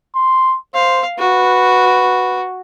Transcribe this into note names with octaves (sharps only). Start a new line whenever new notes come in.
C6
C5 F5
F#4 B4